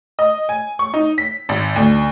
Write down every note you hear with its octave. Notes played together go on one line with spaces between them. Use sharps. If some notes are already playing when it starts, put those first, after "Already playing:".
D#5
G#5
C#6
D#4
B6
G#1
D2